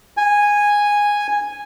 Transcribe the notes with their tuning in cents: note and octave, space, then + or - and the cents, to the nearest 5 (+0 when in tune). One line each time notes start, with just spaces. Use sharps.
G#5 -10